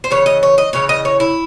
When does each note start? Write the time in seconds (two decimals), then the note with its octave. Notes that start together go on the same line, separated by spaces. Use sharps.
0.04 C5
0.10 C#3 E3 C#5
0.26 D#5
0.43 C#5
0.58 D#5
0.73 C#3 E3 C#5
0.89 D#5
1.05 C#5
1.20 E4